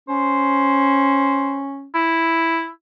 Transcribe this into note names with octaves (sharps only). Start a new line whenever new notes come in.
C#4 C5
E4